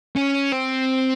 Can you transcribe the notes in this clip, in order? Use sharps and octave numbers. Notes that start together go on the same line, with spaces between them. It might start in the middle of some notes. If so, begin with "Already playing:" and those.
C#4
C4